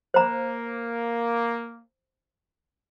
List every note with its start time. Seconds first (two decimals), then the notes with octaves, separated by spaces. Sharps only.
0.14 A#3 C5 A#5